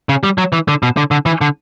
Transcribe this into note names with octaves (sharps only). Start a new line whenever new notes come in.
C#3
G3
F#3
E3
D3
B2
D3
D3
E3
D3